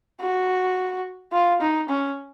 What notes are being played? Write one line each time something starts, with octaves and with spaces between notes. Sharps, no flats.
F#4
F4
D#4
C#4